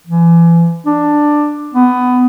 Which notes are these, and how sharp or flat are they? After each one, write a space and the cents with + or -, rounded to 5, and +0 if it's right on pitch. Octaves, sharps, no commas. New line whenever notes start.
E3 +35
D4 +10
B3 +15